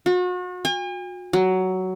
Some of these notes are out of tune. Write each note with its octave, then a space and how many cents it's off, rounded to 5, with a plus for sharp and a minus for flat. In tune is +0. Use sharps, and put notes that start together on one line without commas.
F#4 -40
G#5 -45
F#3 +10